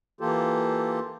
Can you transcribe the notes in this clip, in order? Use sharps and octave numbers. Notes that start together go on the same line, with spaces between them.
E3 A#3 F4 G4 A4